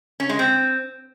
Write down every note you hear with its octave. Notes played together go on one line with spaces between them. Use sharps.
C#4
G#3
C4